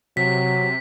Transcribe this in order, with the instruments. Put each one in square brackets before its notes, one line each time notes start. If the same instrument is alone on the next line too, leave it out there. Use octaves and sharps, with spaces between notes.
[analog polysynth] C3 [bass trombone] F#3 [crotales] B6